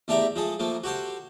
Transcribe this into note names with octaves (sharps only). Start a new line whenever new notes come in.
E2 A3 D4 G4 E5 A#5
F3 G#3 A4
F3 A3 A#3
F#4 G4 A4 C5